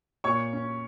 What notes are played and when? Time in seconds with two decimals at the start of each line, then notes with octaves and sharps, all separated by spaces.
0.24 A#2 C#5 C#6
0.53 C#4